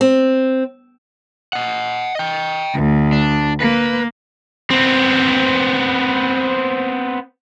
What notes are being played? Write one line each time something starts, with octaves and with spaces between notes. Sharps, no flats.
C4
D#5 F#5
D#5 G5
D2
D4
A#3 B4
B3 C4